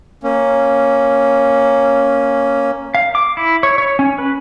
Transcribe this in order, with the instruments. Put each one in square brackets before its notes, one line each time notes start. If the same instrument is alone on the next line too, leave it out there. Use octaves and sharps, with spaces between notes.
[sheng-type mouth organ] A#3 C#4
[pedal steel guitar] F5
D6
E4
C#5
C#5
C#4
B4